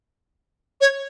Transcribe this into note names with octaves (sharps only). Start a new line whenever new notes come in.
C#5